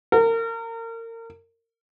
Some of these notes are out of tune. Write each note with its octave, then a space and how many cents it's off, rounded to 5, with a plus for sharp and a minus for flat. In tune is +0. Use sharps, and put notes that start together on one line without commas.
A#4 -30